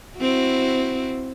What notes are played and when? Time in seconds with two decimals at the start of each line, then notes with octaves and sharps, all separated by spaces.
0.19 C4 E4 F#4